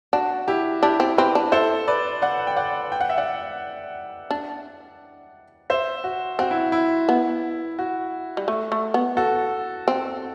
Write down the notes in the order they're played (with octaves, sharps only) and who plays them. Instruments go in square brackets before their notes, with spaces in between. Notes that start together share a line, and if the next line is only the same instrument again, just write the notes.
[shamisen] D4 [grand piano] F#4
[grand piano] E4 G4
[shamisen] D4 [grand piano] E4 G4
[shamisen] C4
[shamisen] C4 [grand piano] G4 B4
[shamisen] D4
[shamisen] E4 [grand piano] A4 C5
[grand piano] B4 D5
D5 F#5
G5
D5 F#5
G5
F#5
E5
D5 F#5
[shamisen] D4
[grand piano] C5 E5
F#4
[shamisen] C4 [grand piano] F#4
[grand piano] E4
E4
[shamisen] B3
[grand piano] F#4
[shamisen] G3
A3
A3
B3
[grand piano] F#4 A4
[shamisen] C4